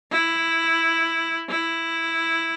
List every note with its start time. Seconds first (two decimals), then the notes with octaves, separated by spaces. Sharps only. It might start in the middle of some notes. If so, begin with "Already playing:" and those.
0.11 E4
1.49 E4